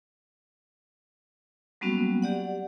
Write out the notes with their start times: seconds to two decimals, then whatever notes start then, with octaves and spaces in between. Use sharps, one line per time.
1.81 F#3 G3 A#3 B3 C#4 F#4
2.22 G4 D5 F#5